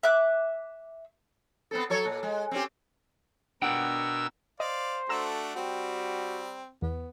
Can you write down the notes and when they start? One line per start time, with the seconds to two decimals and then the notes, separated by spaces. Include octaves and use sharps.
0.03 E5 D6 F#6
1.71 B3 C4 A4
1.90 F#3 A4 C#5
2.05 A#2
2.23 G#3
2.51 C4 C#4 G4
3.62 B2 D4 A#4 F#5 G5 E6
4.60 C5 D5 D#5 F5
5.09 A3 D4 F#4 A4 A#5 E6
5.56 G3 C4 F#4
6.82 E2 B3